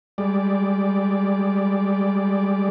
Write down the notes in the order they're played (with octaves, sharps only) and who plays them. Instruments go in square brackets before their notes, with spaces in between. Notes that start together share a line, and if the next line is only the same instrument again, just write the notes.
[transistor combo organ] G3 G#3 D5